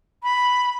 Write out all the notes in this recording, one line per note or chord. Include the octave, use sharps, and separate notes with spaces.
B5